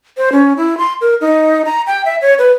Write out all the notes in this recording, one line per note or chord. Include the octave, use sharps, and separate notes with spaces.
C5
C#4
E4
C6
A#4
D#4
A#5
G5
E5
C#5
B4